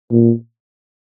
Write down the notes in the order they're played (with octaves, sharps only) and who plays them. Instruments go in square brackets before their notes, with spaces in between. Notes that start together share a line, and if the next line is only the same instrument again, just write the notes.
[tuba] A#2